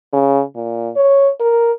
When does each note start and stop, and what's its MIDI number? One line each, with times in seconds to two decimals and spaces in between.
0.13 0.43 49
0.56 0.90 46
0.96 1.30 73
1.40 1.72 70